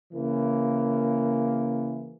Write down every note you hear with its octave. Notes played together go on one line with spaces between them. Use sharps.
C#3 E3 A#3